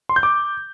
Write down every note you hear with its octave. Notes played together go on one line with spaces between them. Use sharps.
C6
G6
D6